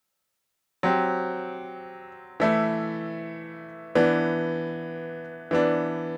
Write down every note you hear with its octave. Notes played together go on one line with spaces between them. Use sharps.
F#3 C4 G4
E3 A3 E4
E3 B3 D4
E3 B3 D4